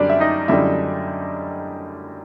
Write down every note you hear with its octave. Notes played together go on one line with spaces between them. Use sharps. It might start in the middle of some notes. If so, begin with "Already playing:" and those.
Already playing: F#2 D3 G3 D4 D5
E5
D#4 D#5
F#2 D3 G3 E4 E5